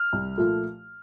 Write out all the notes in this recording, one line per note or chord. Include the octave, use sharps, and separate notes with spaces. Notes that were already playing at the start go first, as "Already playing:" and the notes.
Already playing: F6
C2
A#2 F3 A3